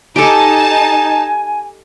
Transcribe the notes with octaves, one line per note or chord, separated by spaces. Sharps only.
D#4 G4 A4 G#5 A5